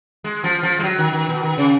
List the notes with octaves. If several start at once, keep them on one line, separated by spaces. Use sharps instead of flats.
G#3
F3
F3
G#3
F#3
D#3
D#3
B2
D#3
C#3